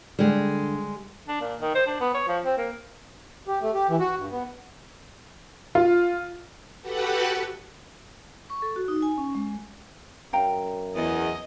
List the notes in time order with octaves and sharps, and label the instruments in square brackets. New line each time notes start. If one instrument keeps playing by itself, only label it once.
[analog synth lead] D3 [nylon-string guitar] G3 G#3
[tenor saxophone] D4
A#2
D#3
C5
D4
B3
C#5
F3
C4
A#3
[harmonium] G4
A3
G4
E3
F#4
G2
B3
[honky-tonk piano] F4
[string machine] F#4 G4 A4 B4 F#5
[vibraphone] C#6
A4
F#4
D#4
G#5
C#4
G#3
[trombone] F#2 [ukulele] F5 G5 A#5
[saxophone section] E2 [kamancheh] D#5